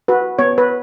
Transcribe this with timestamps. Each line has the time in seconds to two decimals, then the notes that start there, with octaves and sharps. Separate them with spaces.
0.08 F#4 B4
0.39 B3 C#5
0.58 B4